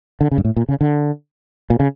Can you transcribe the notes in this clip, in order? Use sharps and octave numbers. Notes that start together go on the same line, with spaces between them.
D3
C#3
G2
A2
A#2
C#3
D3
A#2
C#3